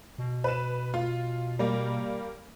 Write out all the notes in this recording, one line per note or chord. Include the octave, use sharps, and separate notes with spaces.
B2
B4 E7
F4
G3 A#3